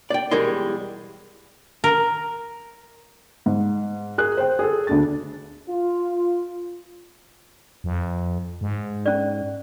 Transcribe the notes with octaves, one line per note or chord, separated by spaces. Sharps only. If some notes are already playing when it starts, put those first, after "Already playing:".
D5 G5
B1 E3 G3 G#3 A#4 C6
A#4
G#2
G#4 A#4 F#6
C5 G5
G#4 A4
D2 D4 A6
F4
F2
G#2
C#4 D5